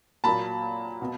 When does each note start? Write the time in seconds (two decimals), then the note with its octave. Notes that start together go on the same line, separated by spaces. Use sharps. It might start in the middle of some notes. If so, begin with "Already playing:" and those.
0.24 A#2 F#3 A#3 A5 B5
1.02 B2